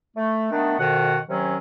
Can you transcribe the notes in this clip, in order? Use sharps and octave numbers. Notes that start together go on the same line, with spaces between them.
A3
D#3 A3 B3 D4
F2 B2 D#3 F#5
C3 D#3 F#3 C#4